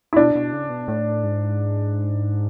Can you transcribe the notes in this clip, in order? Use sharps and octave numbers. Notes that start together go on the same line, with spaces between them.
E4
B2 D4
B2
C#3
B2
A2
G#2